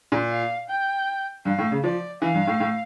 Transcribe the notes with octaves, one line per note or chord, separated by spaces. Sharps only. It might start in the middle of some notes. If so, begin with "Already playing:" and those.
A#2
F5
G5
G2 F5
A2
C#3
F3 D5
E3 F5
G2
A2
A2